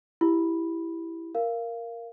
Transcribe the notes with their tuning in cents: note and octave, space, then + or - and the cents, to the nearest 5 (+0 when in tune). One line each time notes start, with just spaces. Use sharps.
E4 +5 G4 +0 B5 -5
A#4 +0 F5 -15